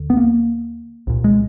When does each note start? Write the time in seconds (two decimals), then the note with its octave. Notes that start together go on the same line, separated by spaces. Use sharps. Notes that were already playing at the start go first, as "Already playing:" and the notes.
Already playing: D#2 D3
0.10 B3
0.17 A#3
1.07 C2 A#2
1.24 G#3